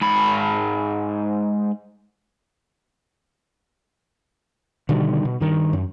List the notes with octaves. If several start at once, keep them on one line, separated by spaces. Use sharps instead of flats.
G#2 B5
B2 D3 D#3 G3
B2
G2 D#3
F#2